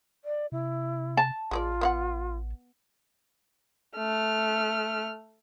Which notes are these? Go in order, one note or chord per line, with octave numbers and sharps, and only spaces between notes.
D5
C3 E4
A5
A1 G#3 F4 G#4 D5
B3 F5 F#5
A3 F6